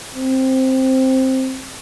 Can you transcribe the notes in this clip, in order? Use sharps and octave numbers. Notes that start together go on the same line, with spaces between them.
C4